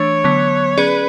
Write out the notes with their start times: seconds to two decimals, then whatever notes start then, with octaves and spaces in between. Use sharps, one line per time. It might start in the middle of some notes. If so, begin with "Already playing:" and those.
Already playing: E3 A3 D4 C#5
0.24 D3 F#3 B3
0.77 C#4 G#4 B4 D5